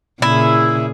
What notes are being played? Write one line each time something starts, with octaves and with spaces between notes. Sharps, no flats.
A#2 C#3 E4 G#4